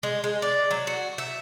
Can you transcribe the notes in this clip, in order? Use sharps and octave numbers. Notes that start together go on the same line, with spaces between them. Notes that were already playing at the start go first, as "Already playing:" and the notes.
G#3
G#3
D5
F#3
F#4
E5